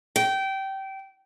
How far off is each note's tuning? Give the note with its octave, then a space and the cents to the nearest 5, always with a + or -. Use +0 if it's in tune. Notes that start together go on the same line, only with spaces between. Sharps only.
G5 -20